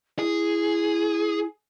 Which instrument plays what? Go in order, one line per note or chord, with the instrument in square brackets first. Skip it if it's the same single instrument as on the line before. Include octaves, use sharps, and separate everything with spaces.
[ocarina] E4 [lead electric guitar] G#4